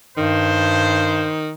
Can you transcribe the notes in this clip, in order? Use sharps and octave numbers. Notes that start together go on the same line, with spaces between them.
G2 D#3 C5